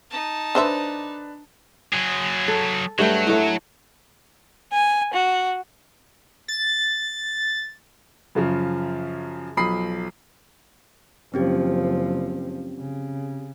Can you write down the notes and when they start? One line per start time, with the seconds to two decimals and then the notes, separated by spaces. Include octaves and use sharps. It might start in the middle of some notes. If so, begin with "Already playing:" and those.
0.10 D#4 A5
0.55 D3 D4 B4 C5 E5
1.93 F#3 G#4
2.48 A4
2.99 G2 F#3 A3 G5
3.27 A2 A3
4.73 G#5
5.13 F#4
6.48 A6
8.35 F#2 C#3 F3
9.57 B1 F3 B5 D#6 C7
11.34 F#1 F3 C4 C#4 G4
12.80 C#3